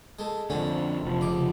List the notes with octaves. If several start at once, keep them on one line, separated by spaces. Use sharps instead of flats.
G#3 A3
F2 D3 A3 C#4
F1 F3
C#2 D6